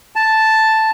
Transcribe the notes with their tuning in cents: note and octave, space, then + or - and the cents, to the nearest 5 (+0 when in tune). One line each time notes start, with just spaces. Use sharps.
A5 +0